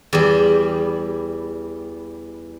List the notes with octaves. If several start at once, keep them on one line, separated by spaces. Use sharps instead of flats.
E2 G3